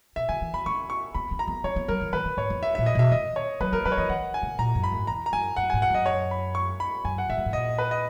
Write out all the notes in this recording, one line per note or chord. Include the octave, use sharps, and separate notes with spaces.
B2 E5
C#3 G#5
E3
B3 B5
C#4 C#6
C#6
B3 B5
C#4
A#5
B3
C#4 C#5
B3
F#3 A#4
E3
D#3 B4
D#3
G#2 C#5
E2
E5
A#2 E5
D#5
B2 E5
D#3 D#5
C#5
F#3 B4
A#3 A#4
F#3 B4
C#5
E3 D#5
E3 F#5
G#5
C#3
A#2 A#5
F#2
B5
G#2
E2 A#5
A#5
F#2 G#5
F#2 F#5
G#5
G#2
F#5
F#2 D#5
C#5
B5
C#6
B5
F#2 G#5
F#5
G#2 E5
F#2
G#2
A#2 D#5
B4
D#5